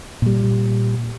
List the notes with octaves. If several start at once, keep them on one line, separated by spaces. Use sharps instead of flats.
A#2 G3